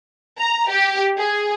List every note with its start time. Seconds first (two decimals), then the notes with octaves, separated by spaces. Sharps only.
0.38 A#5
0.69 G4
1.17 G#4